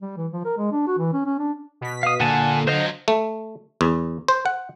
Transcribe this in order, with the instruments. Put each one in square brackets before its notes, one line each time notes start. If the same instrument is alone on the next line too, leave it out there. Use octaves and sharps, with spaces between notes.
[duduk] G3
E3
F3
A#4
G#3
D4
F#4
E3
C#4
C#4
D4
[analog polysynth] B2 B6
[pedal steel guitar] F5 D#6
[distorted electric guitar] A#2 [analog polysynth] D3 [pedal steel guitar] F#5 G#5 A5
[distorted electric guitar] F#3 F4 [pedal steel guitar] C5 D#5 F#5
[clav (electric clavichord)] A3
E2
C5
F#5